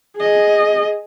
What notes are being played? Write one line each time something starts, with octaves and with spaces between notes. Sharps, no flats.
G#4 D#5